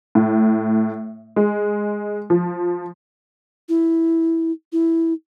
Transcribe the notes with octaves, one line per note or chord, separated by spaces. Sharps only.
A2
G#3
F3
E4
E4